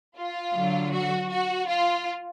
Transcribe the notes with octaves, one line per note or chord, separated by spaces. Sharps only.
F4
D3 F#3
F#4
F#4
F4